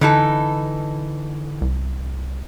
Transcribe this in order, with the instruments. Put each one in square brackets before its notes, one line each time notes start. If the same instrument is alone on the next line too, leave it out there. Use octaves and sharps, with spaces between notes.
[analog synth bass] D3 [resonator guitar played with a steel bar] E3 D#4 A4
[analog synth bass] C2